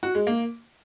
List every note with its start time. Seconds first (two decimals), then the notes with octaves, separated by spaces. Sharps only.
0.03 F#4
0.15 G#3
0.27 A#3